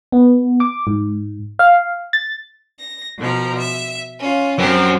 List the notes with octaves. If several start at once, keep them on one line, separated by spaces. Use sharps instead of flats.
B3
D6
G#2
F5
A6
A#6
B2 F3 A#4
E5
C#4 F4
F#2 C4 G4 C5